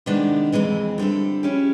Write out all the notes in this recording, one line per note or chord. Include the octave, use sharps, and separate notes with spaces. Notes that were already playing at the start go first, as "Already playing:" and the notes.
C3 D#3 G#3 B3 D4
F2 C3 E3 G#3 C4
D3 G3 C4 E4 A4
F3 G#3 C#4 E4 G4